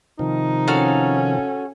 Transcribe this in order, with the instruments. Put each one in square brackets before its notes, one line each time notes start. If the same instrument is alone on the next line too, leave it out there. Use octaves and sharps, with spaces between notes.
[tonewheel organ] C3 D#3 F3 [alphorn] D#4
[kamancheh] C#4 [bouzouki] F#4 A4 F5